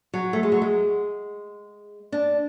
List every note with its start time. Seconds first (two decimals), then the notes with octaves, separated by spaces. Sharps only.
0.14 F#3
0.33 A3
0.43 G#3
0.52 F#3
0.62 G#3
2.12 D4